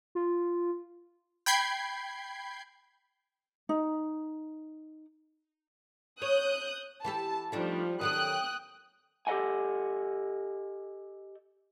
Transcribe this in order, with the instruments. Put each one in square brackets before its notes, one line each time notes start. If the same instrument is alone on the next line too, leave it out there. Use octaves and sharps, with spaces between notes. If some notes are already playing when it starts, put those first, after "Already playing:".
[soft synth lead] F4
[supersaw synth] G5 B5 G6 G#6 C7
[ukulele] D#4
[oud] C#5 [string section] D#6 F#6 G6
[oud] E3 G4 A4 [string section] A5
[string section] F3 G3 [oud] A3 D4 D#4
[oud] D#3 F#3 A4 [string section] G5 D#6 F#6
[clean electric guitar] G4 A4 B4 D#5 F#5 G#5